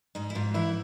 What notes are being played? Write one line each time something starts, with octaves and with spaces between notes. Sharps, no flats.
G#2 D#4
E4
G#2 F4
E3 E4